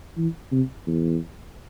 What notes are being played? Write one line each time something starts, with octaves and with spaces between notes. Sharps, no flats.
E3
C3
E2